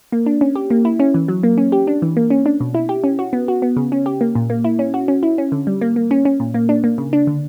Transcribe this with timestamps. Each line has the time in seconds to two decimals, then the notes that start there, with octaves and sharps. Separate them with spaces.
0.12 A#3
0.26 D4
0.41 C#4
0.56 G4
0.70 A#3
0.85 E4
1.00 C#4
1.14 E3
1.28 F#3
1.43 A#3
1.58 C#4
1.72 G4
1.87 D4
2.02 E3
2.17 A#3
2.30 C#4
2.46 D4
2.60 B2
2.74 E4
2.89 G4
3.04 C#4
3.19 F#4
3.33 B3
3.48 F#4
3.62 B3
3.76 C#3
3.92 C#4
4.06 G4
4.21 A#3
4.35 A#2
4.50 A#3
4.64 E4
4.79 C#4
4.94 F#4
5.08 C#4
5.23 E4
5.38 C#4
5.52 D3
5.67 G3
5.81 A#3
5.96 A#3
6.11 C#4
6.25 C#4
6.40 A#2
6.54 A#3
6.69 D4
6.84 A#3
6.98 C#3
7.13 D4
7.27 D3